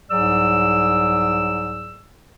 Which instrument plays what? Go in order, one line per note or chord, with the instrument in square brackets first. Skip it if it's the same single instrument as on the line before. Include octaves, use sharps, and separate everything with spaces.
[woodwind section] C2 G#2 F#3 G#4 D5 E6